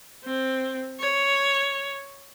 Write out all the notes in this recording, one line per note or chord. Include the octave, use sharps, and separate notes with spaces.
C4
C#5